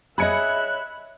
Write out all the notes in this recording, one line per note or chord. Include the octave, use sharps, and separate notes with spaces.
G#4 C#5 D#5 E5 B5 F#6 G#6 C#7